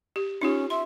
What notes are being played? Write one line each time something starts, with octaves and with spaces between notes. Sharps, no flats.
G4
C#4 D#4 F4 G4
E5 C6